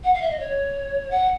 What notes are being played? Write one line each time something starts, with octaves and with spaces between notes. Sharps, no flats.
F#5
F5
E5
D#5
C#5
F#5